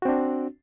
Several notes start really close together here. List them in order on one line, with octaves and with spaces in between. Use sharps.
F#4 C4 D4